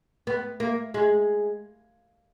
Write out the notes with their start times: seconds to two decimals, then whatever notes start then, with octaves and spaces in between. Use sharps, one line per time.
0.27 B3
0.60 A#3
0.94 G#3